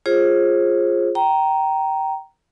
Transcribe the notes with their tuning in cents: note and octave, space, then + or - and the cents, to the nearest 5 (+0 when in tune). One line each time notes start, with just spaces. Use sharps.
F4 +0 G#4 -5 C5 +35
G5 -15 A#5 +0